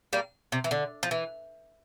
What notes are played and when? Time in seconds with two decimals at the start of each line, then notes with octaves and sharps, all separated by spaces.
0.13 G3 A#3
0.52 C3
0.64 E3
0.71 D3
1.03 F3
1.11 E3